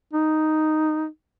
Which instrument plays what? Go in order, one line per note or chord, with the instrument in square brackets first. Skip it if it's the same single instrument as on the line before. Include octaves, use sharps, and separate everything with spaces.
[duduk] D#4